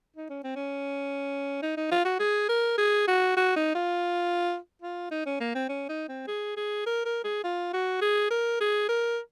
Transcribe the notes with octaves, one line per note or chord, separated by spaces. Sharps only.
D#4
C#4
C4
C#4
D#4
D#4
F4
F#4
G#4
A#4
G#4
F#4
F#4
D#4
F4
F4
D#4
C#4
A#3
C4
C#4
D#4
C4
G#4
G#4
A#4
A#4
G#4
F4
F#4
G#4
A#4
G#4
A#4